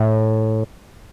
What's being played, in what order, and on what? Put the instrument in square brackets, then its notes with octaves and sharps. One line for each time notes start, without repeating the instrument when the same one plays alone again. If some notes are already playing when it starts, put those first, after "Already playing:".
Already playing: [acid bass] A2